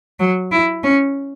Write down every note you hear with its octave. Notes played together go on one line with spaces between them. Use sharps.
F#3
E4
C#4